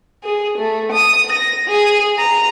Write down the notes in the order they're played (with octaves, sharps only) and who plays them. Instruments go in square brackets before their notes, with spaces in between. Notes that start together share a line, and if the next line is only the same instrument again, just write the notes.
[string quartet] G#4
A3
D#6
A#6
G#4
A#5